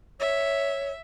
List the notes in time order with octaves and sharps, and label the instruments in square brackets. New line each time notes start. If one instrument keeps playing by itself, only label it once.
[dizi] C#5 [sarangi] E5